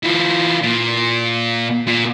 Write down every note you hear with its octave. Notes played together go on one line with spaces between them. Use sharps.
E3 F4
A#2
A#2